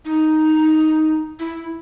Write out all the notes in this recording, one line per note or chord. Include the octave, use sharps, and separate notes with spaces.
D#4
E4